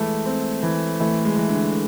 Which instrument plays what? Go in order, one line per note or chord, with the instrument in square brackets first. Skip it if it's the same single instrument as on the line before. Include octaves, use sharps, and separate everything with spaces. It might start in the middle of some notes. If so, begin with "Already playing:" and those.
Already playing: [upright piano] E3 A3 [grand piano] G#3
[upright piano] C4
E3
[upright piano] E3 [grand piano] A3
[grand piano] G#3
[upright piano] E3
[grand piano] D3